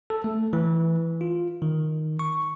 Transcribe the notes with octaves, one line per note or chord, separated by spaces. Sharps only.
A4
A3
E3
F4
D#3
C#6